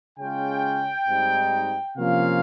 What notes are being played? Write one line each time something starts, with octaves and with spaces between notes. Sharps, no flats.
C#3 G#3 C#4 F4 G5
G#2 G3 C4 D#4
C3 F3 A#3 C#4 F4 F5